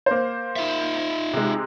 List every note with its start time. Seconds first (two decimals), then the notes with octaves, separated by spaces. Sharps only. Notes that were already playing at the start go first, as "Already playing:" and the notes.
0.06 A#3 C5
0.56 D#4 F4 E5
1.33 C3 G#3